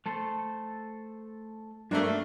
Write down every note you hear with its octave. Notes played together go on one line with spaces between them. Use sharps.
A3 A4 C5
G2 A3 A#3 D4 F#4